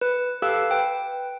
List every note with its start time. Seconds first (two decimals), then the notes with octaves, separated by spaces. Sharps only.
0.01 B4
0.42 G4 A4 B4 F5 E6
0.71 B4 G5